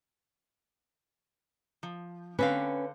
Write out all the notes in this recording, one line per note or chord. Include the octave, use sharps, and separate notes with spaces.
F3
D3 C4 C#4 B4 F5